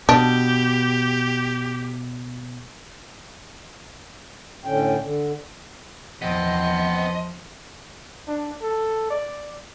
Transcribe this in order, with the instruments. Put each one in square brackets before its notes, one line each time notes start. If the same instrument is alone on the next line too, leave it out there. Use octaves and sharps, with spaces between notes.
[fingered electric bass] B2 [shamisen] D4 [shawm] G4
[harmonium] A2 D3 C#4 G5
D3
[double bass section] E2 [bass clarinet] F3 [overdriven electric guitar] B3 C4 [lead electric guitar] D#5
[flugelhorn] D4
A4
D5